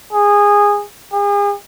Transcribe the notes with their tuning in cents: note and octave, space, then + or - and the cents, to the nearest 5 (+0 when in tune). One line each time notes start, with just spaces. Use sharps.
G#4 -15
G#4 -40